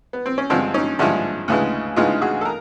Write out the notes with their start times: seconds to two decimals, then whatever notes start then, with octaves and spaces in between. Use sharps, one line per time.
0.13 B3
0.26 C4
0.38 C#4
0.50 G2 D3 F3 G#3 C4 D4
0.74 C#4 D#4
0.99 G2 D3 F3 G#3 D4 E4
1.48 D2 C#3 E3 G#3
1.96 D2 C#3 E3 G#3 D#4 F4
2.21 F#4 G#4
2.41 A4
2.45 A#4